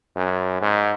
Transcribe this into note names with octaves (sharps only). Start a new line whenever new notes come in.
F#2
G#2